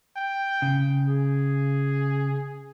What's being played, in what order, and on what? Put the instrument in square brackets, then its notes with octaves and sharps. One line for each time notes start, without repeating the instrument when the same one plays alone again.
[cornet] G5
[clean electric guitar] C#3
[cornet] G#4